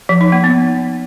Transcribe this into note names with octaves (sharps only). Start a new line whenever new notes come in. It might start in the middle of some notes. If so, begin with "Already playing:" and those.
F3
D#4
A#3
B3